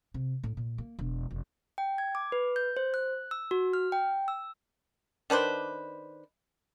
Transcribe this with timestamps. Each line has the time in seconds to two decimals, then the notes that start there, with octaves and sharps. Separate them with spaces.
0.14 C3
0.43 A2
0.57 A#2
0.78 A#3
0.99 E1
1.31 F1
1.78 G5
1.98 G#6
2.15 D6
2.32 B4
2.56 G6
2.77 C5
2.94 F#6
3.31 E6
3.51 F#4
3.73 F6
3.92 G5
4.28 E6
5.30 D#3 D4 B4 C5